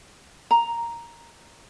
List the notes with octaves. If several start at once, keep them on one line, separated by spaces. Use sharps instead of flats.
A#5